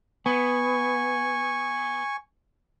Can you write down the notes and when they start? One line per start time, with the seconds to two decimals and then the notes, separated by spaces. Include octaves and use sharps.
0.26 B3 G#5 C#6